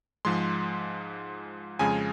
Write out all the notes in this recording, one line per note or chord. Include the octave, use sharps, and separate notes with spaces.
G#2 F3 G#3 C6
F2 C#3 F3 G#3 G#5